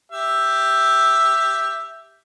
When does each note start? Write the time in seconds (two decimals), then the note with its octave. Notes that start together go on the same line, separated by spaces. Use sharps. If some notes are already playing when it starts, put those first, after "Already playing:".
0.12 G4 E5